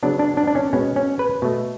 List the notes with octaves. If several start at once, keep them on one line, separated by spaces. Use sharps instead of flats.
C#3 F#3 B3 D4
D4
D4
D4
C#4
B2 G#3 B3 C#4
C#4
B4
B2 A3